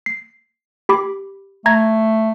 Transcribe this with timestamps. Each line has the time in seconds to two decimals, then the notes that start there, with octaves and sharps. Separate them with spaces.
0.06 C7
0.89 G4 B5 D6
1.66 A3 A#5 G#6 A#6